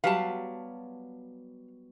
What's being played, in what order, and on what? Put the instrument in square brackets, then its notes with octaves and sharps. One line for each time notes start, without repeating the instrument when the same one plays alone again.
[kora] F#3 G3 B3 [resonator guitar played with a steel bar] F5 A5